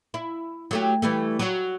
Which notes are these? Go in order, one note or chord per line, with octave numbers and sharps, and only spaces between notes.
E4
F#3 A3 G4
E3 G3 A3
F#3 F#4